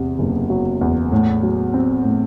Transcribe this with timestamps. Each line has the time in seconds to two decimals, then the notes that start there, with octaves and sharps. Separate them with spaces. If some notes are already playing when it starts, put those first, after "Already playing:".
Already playing: E2 C3
0.19 F#1
0.50 F#3
0.81 E2
1.12 A2
1.43 F#3
1.74 C4
2.04 A2